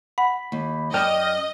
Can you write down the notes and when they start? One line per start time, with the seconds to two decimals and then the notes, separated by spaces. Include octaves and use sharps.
0.18 F#5 B5
0.52 D#2
0.94 F#2 D5 D#5 G5 A5 F6